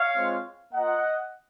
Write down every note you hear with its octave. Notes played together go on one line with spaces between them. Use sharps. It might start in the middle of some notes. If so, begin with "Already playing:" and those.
Already playing: C#5 F5
G#3 C4 F4
A#3 F4 D#5 F#5